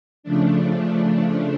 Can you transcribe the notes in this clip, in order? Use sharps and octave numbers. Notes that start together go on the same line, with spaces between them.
C#3 F3 A3 D4